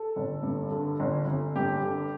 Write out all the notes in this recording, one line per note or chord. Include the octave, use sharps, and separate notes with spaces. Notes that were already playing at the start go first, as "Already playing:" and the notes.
Already playing: A4
G1
G2
D3
G1
G1
G2 G4
D3